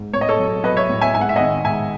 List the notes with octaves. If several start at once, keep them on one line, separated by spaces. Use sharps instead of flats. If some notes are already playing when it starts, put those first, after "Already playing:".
Already playing: G#2
A2 C#5
D#5
A4 C#5
F#3
F#3 B4 D#5
C#5 E5
A2
E5 G#5
G#2 G#5
F#5
E5
D#3 D#5 F#5
G#2 E5 G#5